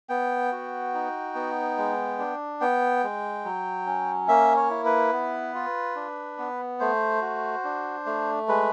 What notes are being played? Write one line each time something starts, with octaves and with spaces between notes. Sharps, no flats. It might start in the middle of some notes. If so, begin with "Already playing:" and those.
B3 G5
F#4
D#4
B3
G#3
D4
B3 G5
G#3
F#3
C#4
A#3 E5
C#5
E4
B4
B3
F4
D4
B3
A3 C5
F#4
D4
A3
G#3 B4